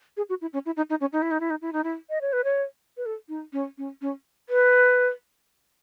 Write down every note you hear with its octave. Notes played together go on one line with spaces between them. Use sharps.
G#4
F#4
E4
C#4
E4
D#4
D#4
C#4
D#4
E4
D#4
E4
D#4
E4
D#4
E4
D#5
C#5
B4
C#5
B4
A4
D#4
C#4
C#4
C#4
B4